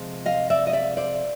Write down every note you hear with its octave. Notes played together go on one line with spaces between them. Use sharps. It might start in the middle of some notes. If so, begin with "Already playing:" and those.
Already playing: C3 F3 G#3
D#5 F5
D5 E5
D#5
D5 E5
C5 D5